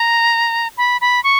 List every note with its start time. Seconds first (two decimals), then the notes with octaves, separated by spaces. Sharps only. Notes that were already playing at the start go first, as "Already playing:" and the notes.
Already playing: A#5
0.77 B5
1.01 B5
1.24 C#6